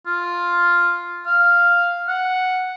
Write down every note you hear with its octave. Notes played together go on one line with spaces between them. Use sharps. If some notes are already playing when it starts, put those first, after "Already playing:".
F4
F5
F#5